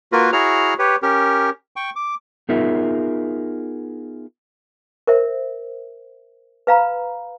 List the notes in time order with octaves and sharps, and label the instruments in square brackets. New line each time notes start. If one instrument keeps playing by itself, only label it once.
[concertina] A#3 F4 F#4 A#4 B4
E4 F#4 G#4 C#5 A#5 F6
G4 B4 C#5
C#4 G4 A#4
G5 C#6
D6
[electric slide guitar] B3 D#4 F4 G#4 A#4 E5
[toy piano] A#4 C5 E5
B4 F5 A#5 B5